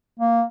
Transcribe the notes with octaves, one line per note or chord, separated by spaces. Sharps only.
A#3